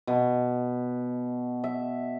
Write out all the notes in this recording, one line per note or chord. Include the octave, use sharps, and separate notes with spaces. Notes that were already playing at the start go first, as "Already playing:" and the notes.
B2
E5